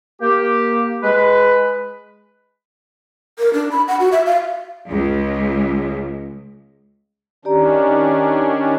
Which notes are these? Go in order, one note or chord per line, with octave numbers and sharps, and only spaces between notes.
A#3 G4
G#3 B4
A#4
D4
B5
F#5
F#4
E5
F5
C#2
D#3 C#4 D4 G4 D5 A#5